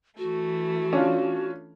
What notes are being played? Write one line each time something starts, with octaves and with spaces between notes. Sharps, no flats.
E3 A3 F#4
C#4 D4 F4